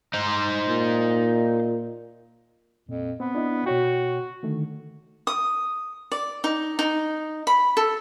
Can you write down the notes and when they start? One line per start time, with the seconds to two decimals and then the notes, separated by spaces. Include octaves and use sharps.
0.14 D#4 C5
0.67 A#2
2.89 F2 A#2
3.20 B3 C4
3.35 D4 E4 D#5
3.66 B2 F#4 C#5 G5
4.43 D3 D#3 A3
5.27 D#6
6.12 D5
6.44 D#4
6.79 D#4
7.47 B5
7.77 A4